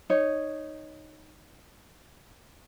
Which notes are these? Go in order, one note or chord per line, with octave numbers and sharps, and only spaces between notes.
D#4 C#5